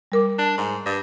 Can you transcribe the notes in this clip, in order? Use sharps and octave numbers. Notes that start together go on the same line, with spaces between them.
G3 A#4 D6
D4
G#2
G2